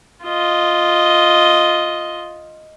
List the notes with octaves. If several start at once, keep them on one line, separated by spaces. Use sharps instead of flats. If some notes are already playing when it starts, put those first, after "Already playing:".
F4 D#5